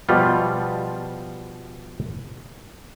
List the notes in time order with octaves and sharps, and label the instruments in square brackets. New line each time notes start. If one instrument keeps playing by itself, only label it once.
[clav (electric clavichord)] B2 F3 G3 F4